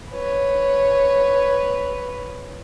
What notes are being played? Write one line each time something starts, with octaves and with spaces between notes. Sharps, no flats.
B4 C#5